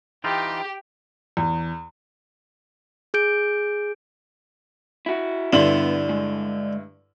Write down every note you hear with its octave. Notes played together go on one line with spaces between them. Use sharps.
E3 D#4 F4 G4 G5
E2
G#4 G6 D7
E4 F#4
G2 D3 B3 E4 C6 F#7
G#3